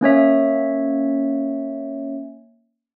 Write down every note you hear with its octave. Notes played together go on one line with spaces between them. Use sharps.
A#3 C#4 C#5 E5